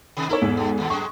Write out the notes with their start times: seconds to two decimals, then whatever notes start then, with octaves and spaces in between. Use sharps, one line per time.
0.17 C3 D#3
0.29 D#4 E4 A4 A#4 C#5
0.42 E2 G#2
0.57 B2
0.78 D#2 B2
0.90 F#2 G#3 C#6